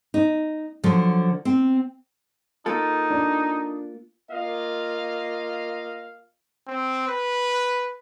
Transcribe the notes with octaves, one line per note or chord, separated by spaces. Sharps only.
D#4
D3 F3 F#3
C4
A#3 D#4 F4 A4
D4
A#3 F4 D#5 F5
C4
B4